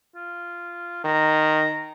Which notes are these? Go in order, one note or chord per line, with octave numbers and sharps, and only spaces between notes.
F4
D#3 A#5